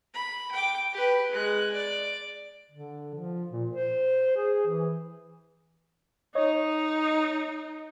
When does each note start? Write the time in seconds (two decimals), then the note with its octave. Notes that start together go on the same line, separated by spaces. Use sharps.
0.14 B5
0.52 G5 D6
0.93 G4 B4
1.32 G#3 F#6
1.73 D5
2.71 D3
3.14 F3
3.51 A#2
3.70 C5
4.36 G#4
4.67 E3
6.35 D#4 C#5 D#5